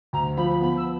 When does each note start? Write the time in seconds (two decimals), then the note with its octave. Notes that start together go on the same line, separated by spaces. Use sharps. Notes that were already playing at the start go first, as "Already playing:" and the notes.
0.13 D2 A#5
0.37 F3 B5
0.49 B5
0.61 B3 B5
0.77 E6